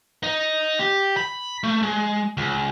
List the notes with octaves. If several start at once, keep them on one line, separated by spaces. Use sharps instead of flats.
D#4
G4
B5
A3
G#3
C#2